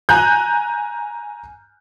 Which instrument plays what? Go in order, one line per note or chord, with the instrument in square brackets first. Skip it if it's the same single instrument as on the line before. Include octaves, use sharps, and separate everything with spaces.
[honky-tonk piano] G#5 A#5 F#6 G6